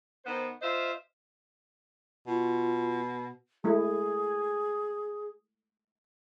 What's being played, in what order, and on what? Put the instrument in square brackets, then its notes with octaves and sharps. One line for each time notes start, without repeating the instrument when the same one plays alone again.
[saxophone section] D#3 B3 C5
F4 C5 D#5 E5
[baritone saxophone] B2 [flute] F4
[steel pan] G#3 A3 E4 [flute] G#4